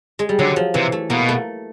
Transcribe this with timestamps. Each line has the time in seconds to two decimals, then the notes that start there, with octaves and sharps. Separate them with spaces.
0.19 G#3
0.29 G3
0.39 D3 F#3
0.56 F3
0.74 C3 E3
0.92 A3
1.10 B2 A#3
1.29 A3